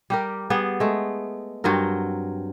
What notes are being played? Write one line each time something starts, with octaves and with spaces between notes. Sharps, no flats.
G3 G4 A#4
G3 B3 G#4
G#3 A3
G2 F#3 C4 A#4